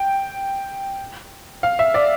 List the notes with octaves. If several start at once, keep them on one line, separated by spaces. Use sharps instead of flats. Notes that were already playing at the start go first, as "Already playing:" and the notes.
Already playing: G5
F5
E5
D5